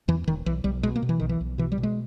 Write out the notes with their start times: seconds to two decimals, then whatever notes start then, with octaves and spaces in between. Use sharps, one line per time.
0.08 E2 E3
0.27 E1 D#3
0.46 B1 E3
0.64 B1 G3
0.83 B2 G#3
0.96 A#3
1.02 B2
1.09 E3
1.20 B1 D#3
1.29 E3
1.41 B1
1.58 B2 E3
1.72 G3
1.78 B2
1.83 G#3